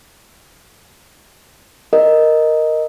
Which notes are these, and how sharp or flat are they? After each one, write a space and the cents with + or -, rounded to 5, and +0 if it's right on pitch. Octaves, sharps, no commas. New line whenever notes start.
A#4 +0 D#5 +0